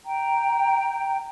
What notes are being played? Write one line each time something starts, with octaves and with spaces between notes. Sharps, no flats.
G5 A#5